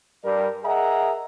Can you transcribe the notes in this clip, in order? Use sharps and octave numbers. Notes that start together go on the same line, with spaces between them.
G2 G3 A#4 D5
G#4 A#4 D#5 E5 F#5 A#5